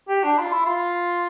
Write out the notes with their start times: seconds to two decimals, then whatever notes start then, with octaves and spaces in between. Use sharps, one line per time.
0.08 G4
0.23 D4
0.38 F4
0.52 E4
0.66 F4